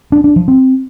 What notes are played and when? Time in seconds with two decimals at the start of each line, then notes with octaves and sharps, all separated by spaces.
0.12 D4
0.24 D4
0.36 F3
0.48 C4